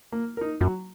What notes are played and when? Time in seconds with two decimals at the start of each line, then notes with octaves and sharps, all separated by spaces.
0.12 A#3
0.37 D#4 A#4
0.60 F#2 F#3